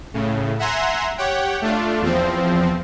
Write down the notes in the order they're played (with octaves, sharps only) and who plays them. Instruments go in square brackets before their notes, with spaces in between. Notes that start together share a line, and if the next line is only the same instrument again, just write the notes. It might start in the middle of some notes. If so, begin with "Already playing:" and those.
[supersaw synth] A2 C#3
E5 F#5 G#5 A#5 C6
G4 C#5 F#5 G5
A3 D4 F4
E2 F3 C4